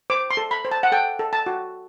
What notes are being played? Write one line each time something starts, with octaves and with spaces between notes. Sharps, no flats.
C5 D6
C6
A4
B5
C5
A5
F#5
A4 G5
A4
A5
F#4